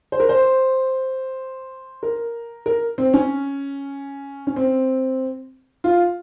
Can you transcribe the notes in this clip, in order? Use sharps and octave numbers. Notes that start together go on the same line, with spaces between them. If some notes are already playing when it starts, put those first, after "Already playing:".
C5
A#4
C5
A#4
A#4
C4
C#4
C#4
C4
F4